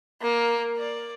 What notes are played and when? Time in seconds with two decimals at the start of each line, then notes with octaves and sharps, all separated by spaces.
0.21 A#3
0.77 D5